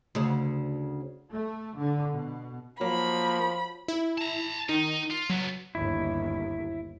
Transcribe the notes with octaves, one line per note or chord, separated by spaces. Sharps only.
D2 C#3
A3
D3
B2
F3 F#3 A#3 B5
E4
A5 A#5
D#3 D#4
F4
C#3 F#3 B3
G1 D#2 E4